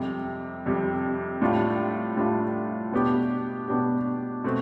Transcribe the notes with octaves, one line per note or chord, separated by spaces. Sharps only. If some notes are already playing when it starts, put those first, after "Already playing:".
Already playing: F2 C3 G3
F2 C3 G3
A2 G3 D4 F4
A2 G3 D4 F4
B2 B3 D4 G4
B2 B3 D4 G4
B2 A3 C4